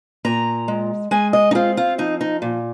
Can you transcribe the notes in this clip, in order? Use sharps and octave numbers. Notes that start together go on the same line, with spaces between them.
A#2 A#5
G#3
G#3 G#5
D#5
D#4
C4 F4
F4
F3 D#4
D#4
A#2